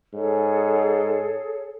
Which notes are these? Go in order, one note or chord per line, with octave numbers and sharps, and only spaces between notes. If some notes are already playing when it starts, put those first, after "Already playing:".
G#2 G#4 A4 C#5